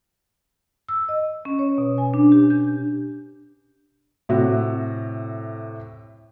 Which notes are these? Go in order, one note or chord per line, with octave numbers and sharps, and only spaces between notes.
E6
D#5
C#4
C#5
B2
G#5
D4
G4
G6
A2 C3 F#4